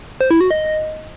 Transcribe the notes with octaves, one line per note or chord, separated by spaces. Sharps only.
C5
E4
F#4
D#5